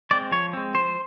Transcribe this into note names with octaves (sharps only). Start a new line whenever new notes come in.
G#3 C4 D5
F3 C#5
G#3 C4
F3 C5